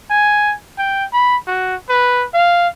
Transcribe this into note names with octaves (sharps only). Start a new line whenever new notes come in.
G#5
G5
B5
F#4
B4
F5